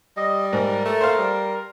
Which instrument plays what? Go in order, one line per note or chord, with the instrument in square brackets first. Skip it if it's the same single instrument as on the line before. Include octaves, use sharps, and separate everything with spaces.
[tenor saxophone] G3 [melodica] D#5
[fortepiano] G#2 [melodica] A#4
[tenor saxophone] A3
[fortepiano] C5 F5
[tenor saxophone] G3